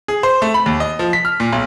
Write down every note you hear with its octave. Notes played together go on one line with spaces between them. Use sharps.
G#4
C5
A3
B5
D#2
D#5
F3
B6
F6
A#2
B1